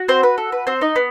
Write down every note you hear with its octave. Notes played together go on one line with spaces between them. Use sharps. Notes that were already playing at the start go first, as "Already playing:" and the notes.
Already playing: F#4
C4 C5
B4
A4
B4
C4 C5
D#4 D#5
B3